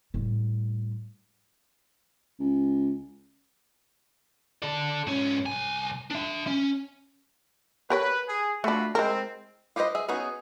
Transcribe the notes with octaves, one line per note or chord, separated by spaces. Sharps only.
A2 G3
C#2
A4 D5
G#2 C#4
C2 G#5
D4 E5
C#4
G4 A#4 B4 C#5
G#4
A3 D4 F4 F#4 B5
G#3 C4 E4 A#4
F4 G4 B4 C5 D#5
G#4 E5
B3 C#4 D#4 F#4 G#4